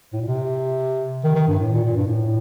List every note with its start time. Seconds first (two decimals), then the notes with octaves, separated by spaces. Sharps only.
0.13 A2
0.21 A#2
0.28 C3
1.24 D#3
1.35 D#3
1.48 G2
1.60 A2
1.72 A#2
1.84 A#2
1.96 G2
2.07 A2